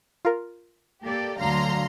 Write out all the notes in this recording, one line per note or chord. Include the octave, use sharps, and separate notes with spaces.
F4 A#4
A#3 G4 A4 D5
D2 D3 F#3 F5 A#5 C6